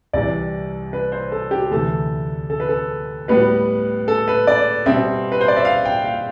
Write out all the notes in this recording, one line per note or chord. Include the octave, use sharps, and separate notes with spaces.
C2 C3 E3 D5
B4
C5
A4
G4
D2 C3 E3 A3 A4
A4
B4
A4
A2 G3 B3 B4
A4
B4
D5
B2 G3 C4 E5
B4
C5
D5
E5
F5
G5
F5